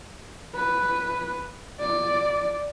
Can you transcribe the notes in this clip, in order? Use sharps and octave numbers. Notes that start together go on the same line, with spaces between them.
B4
D5